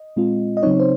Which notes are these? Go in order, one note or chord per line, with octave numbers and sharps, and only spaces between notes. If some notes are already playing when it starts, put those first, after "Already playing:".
Already playing: D#5
A#2 G#3 C4 F4
D#5
C#3 F#3 C4 D#4 C#5
C5